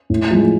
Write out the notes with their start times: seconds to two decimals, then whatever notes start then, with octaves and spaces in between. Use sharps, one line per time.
0.10 A2
0.31 F3 G#3